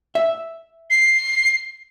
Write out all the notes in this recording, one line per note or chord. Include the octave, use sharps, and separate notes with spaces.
E5
C7